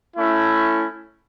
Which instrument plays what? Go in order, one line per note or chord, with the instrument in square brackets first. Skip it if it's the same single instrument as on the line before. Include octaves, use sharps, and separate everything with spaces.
[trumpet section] A3 C#4 E4